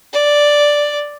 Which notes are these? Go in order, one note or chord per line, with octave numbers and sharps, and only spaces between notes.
D5